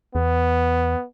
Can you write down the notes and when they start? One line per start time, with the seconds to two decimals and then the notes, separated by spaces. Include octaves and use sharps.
0.15 E2 B3